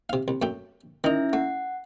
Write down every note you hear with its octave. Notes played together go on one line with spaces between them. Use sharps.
C3 F5
C2
F#2 A3 G5
D#3 C#4 D#4 E4 E5
A3 F#5